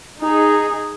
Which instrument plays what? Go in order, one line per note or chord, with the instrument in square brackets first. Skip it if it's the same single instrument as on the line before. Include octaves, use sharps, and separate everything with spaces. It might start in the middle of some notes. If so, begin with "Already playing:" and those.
[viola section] D#4 G#4